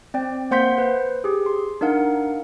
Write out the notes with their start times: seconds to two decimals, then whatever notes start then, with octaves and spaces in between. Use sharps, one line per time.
0.14 C4 D5 G5
0.51 A#3 C5 F#5 C6 G6 B6
0.78 B4 C5
1.24 G4 G#4
1.46 C6
1.81 D4 D#4 A#4 F5 F#5